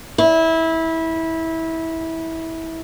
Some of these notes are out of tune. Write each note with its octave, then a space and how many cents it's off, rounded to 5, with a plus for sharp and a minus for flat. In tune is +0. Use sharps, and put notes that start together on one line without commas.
E4 -20